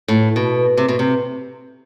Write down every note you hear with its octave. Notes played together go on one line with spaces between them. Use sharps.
A2
B2
C3
B2
C3